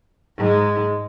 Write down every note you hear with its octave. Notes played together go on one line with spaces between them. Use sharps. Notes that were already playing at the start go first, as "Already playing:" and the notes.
G#2 G#3